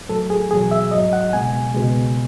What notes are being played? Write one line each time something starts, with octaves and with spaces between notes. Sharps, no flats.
A2 F#3 A4
G#4
E2 B2 F#3 G#4
E5
G#2 F#3 D#5
F#5
C#2 B2 G#3 G#5
C#2 B2 G#3